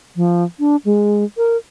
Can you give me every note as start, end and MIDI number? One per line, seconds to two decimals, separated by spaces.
0.16 0.44 53
0.59 0.76 62
0.85 1.24 56
1.37 1.57 70